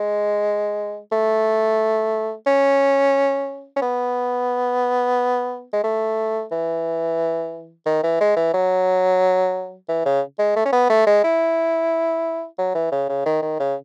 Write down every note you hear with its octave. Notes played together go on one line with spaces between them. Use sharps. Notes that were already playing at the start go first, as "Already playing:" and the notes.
Already playing: G#3
A3
C#4
C#4
B3
G#3
A3
E3
D#3
E3
G#3
E3
F#3
E3
C#3
G#3
A3
C#4
B3
A3
G#3
E4
F#3
E3
C#3
C#3
D#3
D#3
C#3